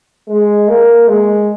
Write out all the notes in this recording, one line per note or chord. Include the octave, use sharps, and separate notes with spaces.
G#3
A#3
G#3